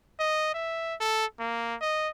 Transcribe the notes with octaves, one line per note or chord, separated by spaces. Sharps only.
D#5
E5
A4
A#3
D#5